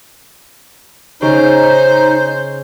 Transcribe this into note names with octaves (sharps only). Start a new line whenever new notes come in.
C#3 D#4 C5